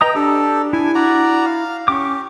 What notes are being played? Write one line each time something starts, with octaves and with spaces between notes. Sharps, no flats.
B4 D#5 G5 A#5 D#6
D4 G4 A4
E4 G#5
F#4 D5 A#5
F5
C#4 G4 C#6 D6